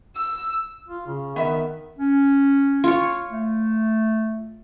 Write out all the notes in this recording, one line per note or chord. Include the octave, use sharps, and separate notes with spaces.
E6
F4
C#3
D#3 B3 E5
C#4
F4 C#5
A3